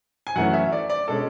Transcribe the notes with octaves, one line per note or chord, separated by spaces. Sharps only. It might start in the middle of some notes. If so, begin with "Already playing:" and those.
G#5
F#2 E3 A3 C#4 F#5
E5
D5
D5
B2 G#3 C#4 A4